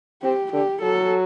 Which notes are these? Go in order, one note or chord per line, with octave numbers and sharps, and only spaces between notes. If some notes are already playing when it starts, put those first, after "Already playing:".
C4 G4
D3 G4
F#3 A4